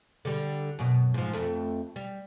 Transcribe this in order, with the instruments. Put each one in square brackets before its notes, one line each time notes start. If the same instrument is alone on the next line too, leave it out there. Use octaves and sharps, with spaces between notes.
[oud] D3 G3
F#2 B2
G#2 F3
F2 A3
G3